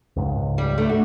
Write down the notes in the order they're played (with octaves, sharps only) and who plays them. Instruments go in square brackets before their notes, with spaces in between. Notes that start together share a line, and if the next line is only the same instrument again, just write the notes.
[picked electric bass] C#2 G#2
[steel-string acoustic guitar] G3
A3 D4
F#4